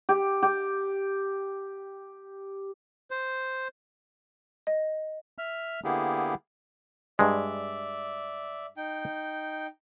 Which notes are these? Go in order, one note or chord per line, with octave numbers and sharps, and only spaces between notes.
G4
G4
C5
D#5
E5 F6
D3 A#3 B3 E4 G4 G#4
G2 G#3 D5 E5
D#4 G5